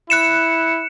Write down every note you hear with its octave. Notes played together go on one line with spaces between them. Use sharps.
E4 F#6 C#7 E7